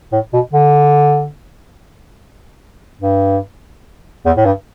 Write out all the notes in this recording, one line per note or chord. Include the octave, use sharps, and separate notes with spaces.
A2
B2
D3
G2
E2
A2
G2